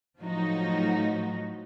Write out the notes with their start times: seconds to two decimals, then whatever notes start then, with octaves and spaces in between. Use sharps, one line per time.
0.19 A2 F3 F#3 D#4 F#4